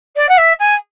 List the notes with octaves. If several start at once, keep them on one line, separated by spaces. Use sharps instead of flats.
D5
F#5
E5
G#5